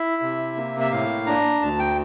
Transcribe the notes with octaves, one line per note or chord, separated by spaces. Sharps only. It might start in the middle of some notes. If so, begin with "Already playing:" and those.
Already playing: E4 E5
C3
A#3
E5
A2 F5
D4 A#5
D2 A5
G5